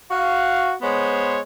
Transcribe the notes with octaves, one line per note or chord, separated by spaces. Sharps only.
F#4 F5
G#3 B3 C5 C#5